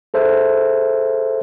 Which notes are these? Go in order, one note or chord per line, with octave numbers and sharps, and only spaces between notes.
G#4 A4 C5 E5